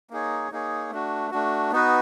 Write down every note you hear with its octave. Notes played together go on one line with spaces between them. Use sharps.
A#3 D#4 G#4 C#5
A#3 D#4 G#4 C#5
A3 D4 F#4
A3 D4 F#4
B3 D#4 F#4 B4